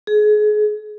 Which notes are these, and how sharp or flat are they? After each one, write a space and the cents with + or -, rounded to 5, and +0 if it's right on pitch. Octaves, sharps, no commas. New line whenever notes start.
G#4 +30